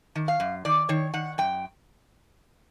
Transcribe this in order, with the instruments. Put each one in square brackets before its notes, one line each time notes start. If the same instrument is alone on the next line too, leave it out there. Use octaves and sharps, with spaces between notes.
[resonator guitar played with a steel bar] D#3
F5
F#2
D#3 D5
D#3 C#5
D#3 F#5
F#2 G5